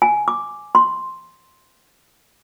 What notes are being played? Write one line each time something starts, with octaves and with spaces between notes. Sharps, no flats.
G#5
D6
C6